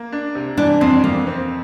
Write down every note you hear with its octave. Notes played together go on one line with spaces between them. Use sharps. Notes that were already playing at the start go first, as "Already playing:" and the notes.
Already playing: A#3
D4
C3
E3 D4
F2 C4
F2 A#3
C4